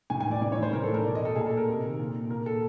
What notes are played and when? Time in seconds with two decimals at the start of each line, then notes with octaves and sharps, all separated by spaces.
0.10 A2 G#5
0.21 G#5
0.26 E3
0.31 D5
0.42 A2 D5
0.52 C#5
0.58 E3
0.63 C5
0.73 A2 A#4
0.84 A4
0.89 E3
0.94 A#4
1.04 B2 D5
1.15 D#5
1.25 A4
1.36 A#2 G#4
1.46 A4
1.57 A#4
1.67 C3
1.83 D#3
1.99 A#2
2.30 A#2 A#4
2.46 A4